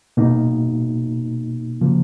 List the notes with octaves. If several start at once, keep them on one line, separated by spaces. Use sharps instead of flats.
B2 A#3 D#4
C#3 F3 A#3